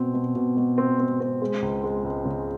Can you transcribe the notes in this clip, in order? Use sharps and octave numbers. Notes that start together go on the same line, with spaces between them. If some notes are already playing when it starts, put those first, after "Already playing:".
Already playing: B2 C4
B2
B2
B2
C4
C4
C4
G#3
C#2
G#3
C#2
C#3